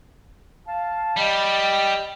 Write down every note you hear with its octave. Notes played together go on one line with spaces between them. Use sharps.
F5 A5
G3 D#5 G5